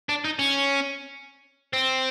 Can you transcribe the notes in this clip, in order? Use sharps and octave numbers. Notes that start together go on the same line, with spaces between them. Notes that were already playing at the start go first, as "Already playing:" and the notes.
D4
D#4
C#4
C4